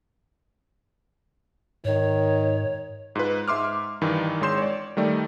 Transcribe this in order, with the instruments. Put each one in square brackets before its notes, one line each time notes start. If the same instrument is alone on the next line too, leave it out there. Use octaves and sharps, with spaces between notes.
[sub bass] G#2 [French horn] D#3 [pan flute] C#5
[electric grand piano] G#2 F4 B4
G#2 E5 C6 D6 F6
G2 D#3 E3
G#1 G#3 C#5 C6 G6 E7
C#5 D5
D#3 G3 A3 D5